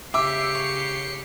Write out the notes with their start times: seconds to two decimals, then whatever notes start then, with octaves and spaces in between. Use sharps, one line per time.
0.14 C#3 G4 E5 D6 C7 C#7
0.55 C#5